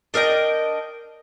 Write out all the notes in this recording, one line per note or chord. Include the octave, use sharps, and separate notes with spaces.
D4 A#4 D#5 G5